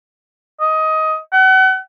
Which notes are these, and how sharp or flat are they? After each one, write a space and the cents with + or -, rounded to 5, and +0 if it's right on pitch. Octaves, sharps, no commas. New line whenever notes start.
D#5 +15
F#5 +35